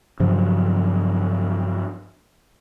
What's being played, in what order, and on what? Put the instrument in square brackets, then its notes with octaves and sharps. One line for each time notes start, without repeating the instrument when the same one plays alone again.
[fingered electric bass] G2 C#3 F3 F#3